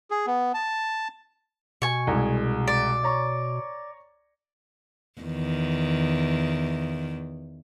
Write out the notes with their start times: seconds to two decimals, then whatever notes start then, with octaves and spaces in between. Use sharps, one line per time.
0.11 G#4
0.27 B3
0.54 A5
1.82 B2 G#5 C#6
2.07 C2 G#3
2.68 D5
3.03 C#5 A#5 C#6
5.21 E2 D#3